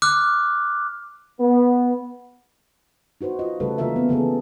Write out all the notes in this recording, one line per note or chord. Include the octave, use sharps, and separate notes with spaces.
D6 F6 F#6
B3
D#4 F#4 B4 C5
F4 D#5
C#3 G3 A3 E4 A4 B4
C#3 E3 A#3 F4 A#4 E5
B3
C#3 E3 B3 G#4 A4